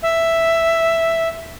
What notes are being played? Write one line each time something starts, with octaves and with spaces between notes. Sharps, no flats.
E5